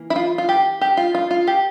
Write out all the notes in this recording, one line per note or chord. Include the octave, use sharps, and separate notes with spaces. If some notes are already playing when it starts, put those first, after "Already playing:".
Already playing: E3 A#3
E4
F4
F4
G4
G4
F4
F4
F4
G4